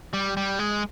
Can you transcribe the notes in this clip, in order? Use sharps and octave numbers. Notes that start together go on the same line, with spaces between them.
G3
G3
G#3